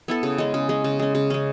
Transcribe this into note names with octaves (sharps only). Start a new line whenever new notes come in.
B3 E4 A4
C#3
G#3 C#4
C#3
G#3 C#4
C#3
G#3 C#4
C#3
G#3 C#4